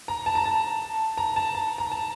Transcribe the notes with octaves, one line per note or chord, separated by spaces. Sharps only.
A#5
A5
A#5
A5
A#5
A5
A#5
A#5
A5